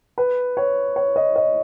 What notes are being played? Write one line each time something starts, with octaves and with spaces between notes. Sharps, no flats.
B4
C#5
C#5
D#5
D#5